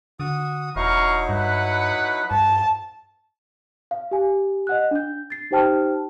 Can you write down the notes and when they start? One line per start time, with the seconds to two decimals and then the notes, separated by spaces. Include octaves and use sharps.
0.20 D3 F#4 D#6
0.76 E1 F#3 D#4 E4 F5 A#5 C#6
1.29 G2 B4 F#5
2.31 G2 A5
3.91 F5
4.11 G4 G#5
4.67 D#5 F#5 F#6
4.91 D4 G6
5.30 A6 C7
5.51 D#4 G4 C5 G5 A5 F6